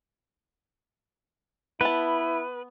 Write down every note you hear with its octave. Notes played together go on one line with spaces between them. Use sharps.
B3 E4 B4 A5